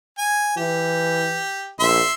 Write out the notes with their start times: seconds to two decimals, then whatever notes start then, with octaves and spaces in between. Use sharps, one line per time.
0.18 G#5
0.57 E3 G4
1.80 A#1 E5 C6